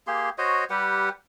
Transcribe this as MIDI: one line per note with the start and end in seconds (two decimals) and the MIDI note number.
0.07 0.30 58
0.07 0.30 67
0.07 0.30 68
0.07 0.30 84
0.38 0.65 66
0.38 0.65 72
0.38 0.65 73
0.38 0.65 75
0.70 1.09 55
0.70 1.09 67
0.70 1.09 71
0.70 1.09 78